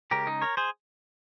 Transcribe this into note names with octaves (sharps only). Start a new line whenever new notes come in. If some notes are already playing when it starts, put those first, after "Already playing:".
C#3 G#3 C#4 G4 A#4
D#4
A#4 C#5
G#4 C5